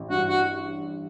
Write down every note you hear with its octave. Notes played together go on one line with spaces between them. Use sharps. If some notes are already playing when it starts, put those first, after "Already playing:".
Already playing: A1
G2 F#4
F#4